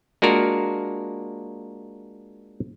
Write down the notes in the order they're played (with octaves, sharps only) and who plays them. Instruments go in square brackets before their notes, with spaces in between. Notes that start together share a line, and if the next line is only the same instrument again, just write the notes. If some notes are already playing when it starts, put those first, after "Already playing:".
[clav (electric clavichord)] G#3 A#3 D4 F4 F#4 A#4